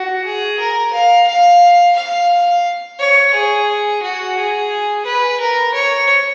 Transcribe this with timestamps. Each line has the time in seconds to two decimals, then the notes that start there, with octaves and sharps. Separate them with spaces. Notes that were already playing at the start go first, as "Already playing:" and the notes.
Already playing: F#4
0.24 G#4
0.59 A#4
0.93 F5
1.27 F5
1.96 F5
2.99 C#5
3.34 G#4
4.02 F#4
4.37 G#4
5.05 B4
5.40 A#4
5.74 C#5